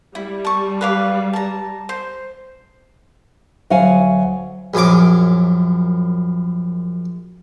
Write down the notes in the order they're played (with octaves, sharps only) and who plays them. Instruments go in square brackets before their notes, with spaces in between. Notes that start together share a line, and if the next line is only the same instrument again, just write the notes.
[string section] G3 [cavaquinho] E4
[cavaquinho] A5 C#6
B4 F5 D6
A5 A#5
C5
[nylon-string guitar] D2 F#3 F5 F#5 G#5
[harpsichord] A#1 F#2 G#5 D6